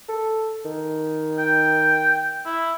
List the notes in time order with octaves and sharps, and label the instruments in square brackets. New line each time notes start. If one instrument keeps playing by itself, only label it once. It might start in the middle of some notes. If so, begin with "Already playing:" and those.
[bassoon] A4
D#3
[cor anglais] G5
E4